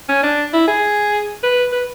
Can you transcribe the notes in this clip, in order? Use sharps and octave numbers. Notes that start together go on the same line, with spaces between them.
C#4
D4
E4
G#4
B4
B4